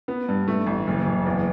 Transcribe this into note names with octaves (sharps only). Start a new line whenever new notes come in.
B3
G2
A3
A1
F#1
F#1
E2